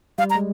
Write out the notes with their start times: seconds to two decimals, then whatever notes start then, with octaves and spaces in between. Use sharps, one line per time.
0.18 G3 F5
0.30 A#5
0.35 G#3